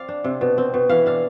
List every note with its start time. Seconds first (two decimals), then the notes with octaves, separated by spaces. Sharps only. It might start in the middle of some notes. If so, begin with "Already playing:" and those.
Already playing: C4 D5 F5
0.08 D4
0.24 C3
0.41 B2
0.58 C4
0.74 B2
0.89 E3 F5
1.06 D4 F5